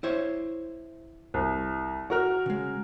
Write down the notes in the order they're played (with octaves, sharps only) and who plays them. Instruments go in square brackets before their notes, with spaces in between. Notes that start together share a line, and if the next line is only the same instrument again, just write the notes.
[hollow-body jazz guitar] E4 C5 C#5
[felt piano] C2
F#4 A#4 F6
[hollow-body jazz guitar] C#3 G#3